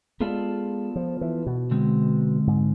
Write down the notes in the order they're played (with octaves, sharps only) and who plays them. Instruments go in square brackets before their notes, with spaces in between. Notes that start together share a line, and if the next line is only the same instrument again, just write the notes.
[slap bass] G#3 [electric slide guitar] B3 F4 A4 D5
[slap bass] F3
E3
B2
[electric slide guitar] D3 G#3 C4
[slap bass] G#2